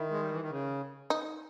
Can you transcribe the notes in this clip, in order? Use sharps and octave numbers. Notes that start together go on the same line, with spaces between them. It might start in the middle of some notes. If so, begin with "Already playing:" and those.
Already playing: D#3 E4
G#3
G3
E3
D#3
C#3
D#4